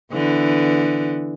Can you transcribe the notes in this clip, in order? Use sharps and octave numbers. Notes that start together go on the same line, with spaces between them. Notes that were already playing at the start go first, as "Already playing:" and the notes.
D3 E3 B3